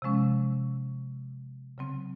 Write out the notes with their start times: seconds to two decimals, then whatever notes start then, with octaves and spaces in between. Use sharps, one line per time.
0.02 C3 F3 G#3 C#4
1.78 C#3 F#3 C4